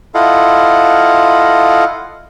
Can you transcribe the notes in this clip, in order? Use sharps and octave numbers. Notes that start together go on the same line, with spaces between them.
E4 F4 A4 D#5 F5 F#5